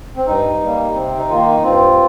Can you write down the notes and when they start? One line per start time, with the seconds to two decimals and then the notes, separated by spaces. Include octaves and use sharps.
0.16 C4
0.26 G2 D#4
0.61 G3 A#3
0.94 C3 C4
1.17 D#4
1.28 D#3 A#3 F4
1.39 D#4
1.62 G2 C4 F4